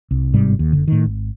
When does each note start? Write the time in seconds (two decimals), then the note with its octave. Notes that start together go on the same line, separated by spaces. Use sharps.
0.11 C2
0.33 G1 G#2 C3 G3
0.59 D#2
0.73 F#1 D3
0.88 A2 D#3
1.05 G#1